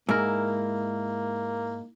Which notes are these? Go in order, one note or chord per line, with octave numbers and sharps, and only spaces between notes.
G#2 A#3 E4 A#4